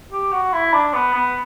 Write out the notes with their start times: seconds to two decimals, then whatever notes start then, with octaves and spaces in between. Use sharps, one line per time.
0.13 G4
0.33 F#4
0.53 E4
0.73 D4
0.93 B3
1.14 B3